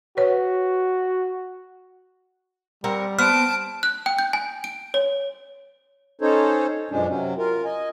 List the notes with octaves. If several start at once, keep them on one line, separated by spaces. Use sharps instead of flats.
F#4 B4 C#5
G3 C4 A#4 F#5
B3 C4 A5 F6 D7
F#6
G5
G6
G#5
D7
C#5
C#4 D#4 A4 C5 C#5
F#2 B2 F3 G#3 C#4 D4
C3 F#3 C#4
F4 A#4
D#5 G#5